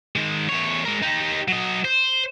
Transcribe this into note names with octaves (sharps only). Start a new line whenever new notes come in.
D#3 G#3
E2 C#5
G#3 A#4
D#4 G4
F#3 D#5
C5